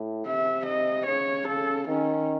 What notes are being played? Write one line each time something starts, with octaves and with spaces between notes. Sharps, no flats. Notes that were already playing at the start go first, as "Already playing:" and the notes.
Already playing: A2
C3 E5
D#5
C#3 C#5
C#3 A4
D#3 C#4